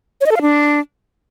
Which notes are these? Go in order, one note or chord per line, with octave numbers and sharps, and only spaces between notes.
C#5
D#5
A4
F5
D4